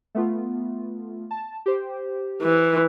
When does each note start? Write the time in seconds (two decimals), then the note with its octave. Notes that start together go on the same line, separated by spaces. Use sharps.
0.15 A3 B3 F4
1.31 A5
1.66 G4 C5
2.42 E3